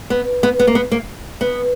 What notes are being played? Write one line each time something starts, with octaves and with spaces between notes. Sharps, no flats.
B3
B3
B3
A#3
B3
A#3
B3